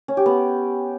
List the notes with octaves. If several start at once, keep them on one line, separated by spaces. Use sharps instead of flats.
C#4
G4
B3